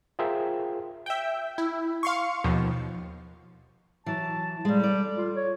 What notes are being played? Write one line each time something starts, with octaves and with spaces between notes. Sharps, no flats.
F4 G#4 A#4 C5 E5 G5
E5 G5
E4
F5 C6 C#6
D#2 B2 F3
E3 F#3 A5
A#2 G3 G#3
A4 D5
F4
C#5